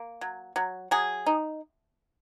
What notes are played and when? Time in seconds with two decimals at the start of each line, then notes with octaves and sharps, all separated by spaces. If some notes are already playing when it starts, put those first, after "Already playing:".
Already playing: A#3
0.21 F#3
0.56 F#3
0.91 F#3 G#4
1.27 D#4